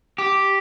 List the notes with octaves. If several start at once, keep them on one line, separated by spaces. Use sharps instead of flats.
G4